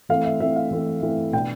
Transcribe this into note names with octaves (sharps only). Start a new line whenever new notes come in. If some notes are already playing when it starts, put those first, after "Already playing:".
E3 A3 C4 F5
E5
E3 A3 C4 E5
F5
E3 A3 C4
E3 A3 C4
B2 B3 D4 G5